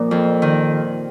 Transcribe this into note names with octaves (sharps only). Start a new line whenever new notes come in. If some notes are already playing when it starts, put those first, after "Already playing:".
Already playing: A#2 F3 D5
F2
D#3